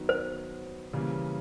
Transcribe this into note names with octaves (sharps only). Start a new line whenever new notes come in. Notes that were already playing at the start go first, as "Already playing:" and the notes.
Already playing: D#3 F#3 B3 D#4
C5
C#3 E3 G3 A#3